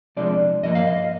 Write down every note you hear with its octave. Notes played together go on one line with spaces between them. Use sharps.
C2 C3 F3 G#3 D4 D5
G2 D3 F3 A#3 D#5
F5
D#5